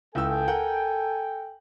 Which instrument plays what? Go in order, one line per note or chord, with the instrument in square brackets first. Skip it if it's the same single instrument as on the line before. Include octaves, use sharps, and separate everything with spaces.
[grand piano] C#2 E4 E6 [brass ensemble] A4 G5 G#5
[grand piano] A#4 F#5 G6